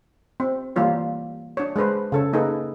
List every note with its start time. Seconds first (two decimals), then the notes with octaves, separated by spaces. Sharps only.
0.40 C4
0.76 E3 G3 A#3 F4 C#5
1.57 D4 C#5
1.76 G#3 D4 B4 C5
2.12 C#3 A4 C#5
2.33 A#3 D#4 G#4 A4 B4